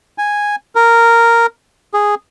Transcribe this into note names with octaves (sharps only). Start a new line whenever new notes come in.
G#5
A#4
G#4